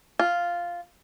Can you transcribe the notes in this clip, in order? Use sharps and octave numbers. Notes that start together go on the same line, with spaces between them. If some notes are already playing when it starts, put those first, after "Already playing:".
F4